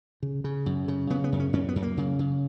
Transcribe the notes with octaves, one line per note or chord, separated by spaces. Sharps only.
C#3
C#3
F#2
C#3
C#3 B3
B3
F#2
C#4
F#2 C#4
B3
F#2
A#3
C#3
C#3